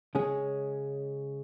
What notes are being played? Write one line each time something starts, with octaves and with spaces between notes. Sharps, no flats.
C#3 G#3 C#4 G#4